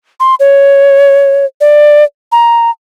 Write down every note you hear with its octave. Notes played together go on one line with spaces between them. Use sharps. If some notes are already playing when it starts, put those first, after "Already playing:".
C6
C#5
D5
A#5